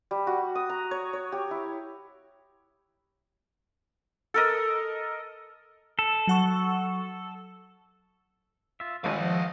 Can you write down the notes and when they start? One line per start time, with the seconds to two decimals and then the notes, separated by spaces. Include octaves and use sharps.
0.11 G3
0.27 F#4
0.55 D#6
0.69 A#5
0.91 C#5
1.13 C#5
1.32 G4
1.51 E4
4.34 A4 A#4 D#5
5.99 A4
6.27 F#3 F#5 C#6
8.80 F4 E5
9.04 G#1 E3 G3 G#3 C#4 B4 F5 F#5
9.18 F3 D#5